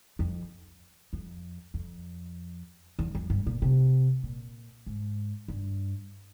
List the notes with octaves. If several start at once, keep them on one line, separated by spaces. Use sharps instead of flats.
F2
F2
F2
E2
F2
G2
A#2
C3
A#2
G#2
G2